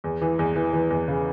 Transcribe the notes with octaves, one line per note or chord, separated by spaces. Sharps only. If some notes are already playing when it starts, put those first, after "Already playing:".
E2
E3
E2
E3
E3
E2
C#3